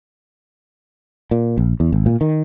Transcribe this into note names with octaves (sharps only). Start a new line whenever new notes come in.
A#2
A#1
E2
G#1
A#2
D#3